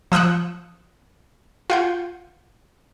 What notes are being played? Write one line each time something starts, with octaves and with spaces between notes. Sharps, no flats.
F3 D#6 E6 F#6 C#7
F4 F#5 G6